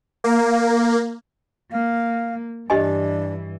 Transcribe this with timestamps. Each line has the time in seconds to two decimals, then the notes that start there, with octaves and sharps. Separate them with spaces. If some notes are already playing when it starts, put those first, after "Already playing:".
0.24 A#3
1.72 A#3 F5
2.70 G2 E3 D4 G4 D#5 G#5